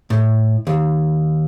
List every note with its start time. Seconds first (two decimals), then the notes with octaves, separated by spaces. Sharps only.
0.10 A2
0.67 D#2